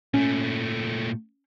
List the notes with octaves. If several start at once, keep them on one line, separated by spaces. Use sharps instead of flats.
A#2 A3 C#4